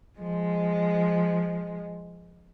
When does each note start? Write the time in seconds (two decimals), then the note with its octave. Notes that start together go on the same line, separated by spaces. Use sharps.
0.19 F3 G#3